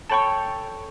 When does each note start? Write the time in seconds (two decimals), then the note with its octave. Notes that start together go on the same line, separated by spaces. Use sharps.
0.10 A4 C#5 G5 A5 B5 C#6